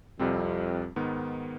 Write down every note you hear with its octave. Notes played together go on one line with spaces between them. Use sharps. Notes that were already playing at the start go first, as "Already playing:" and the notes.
C2 F2 C3 G3 C4
G#2 D#3 B3